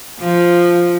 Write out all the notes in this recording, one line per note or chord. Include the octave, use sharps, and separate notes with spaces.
F3